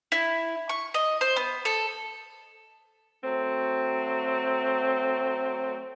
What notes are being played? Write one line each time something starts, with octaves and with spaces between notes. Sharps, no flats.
E4
C#6
D#5
C5
B3
A4
F#3 A3 C4